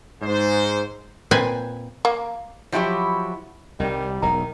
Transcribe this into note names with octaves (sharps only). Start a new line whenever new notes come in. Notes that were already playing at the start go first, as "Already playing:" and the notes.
G#2 C5
A#2 C4 B4 G#5
A#3
F3 F#3 E4 G4 C#5
C2 D#3 G3
E1 B1 B2 D#3 A#5